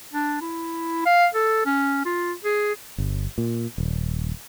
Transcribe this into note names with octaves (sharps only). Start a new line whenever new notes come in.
D4
E4
F5
A4
C#4
F4
G#4
G1
A#2
D#1